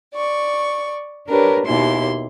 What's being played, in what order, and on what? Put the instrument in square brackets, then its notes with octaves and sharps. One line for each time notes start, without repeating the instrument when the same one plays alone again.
[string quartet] D5 C#6
D4 G4 A#4 B4 C#5
D#2 B2 E4 G4 C6